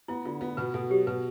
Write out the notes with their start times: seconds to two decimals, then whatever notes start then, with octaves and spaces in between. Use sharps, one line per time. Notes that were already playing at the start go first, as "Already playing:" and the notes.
0.08 B3 E4
0.25 D3 F4
0.41 B3 F4
0.57 B2 B4
0.74 B2 A4
0.90 F#3 G4
1.07 B2 B4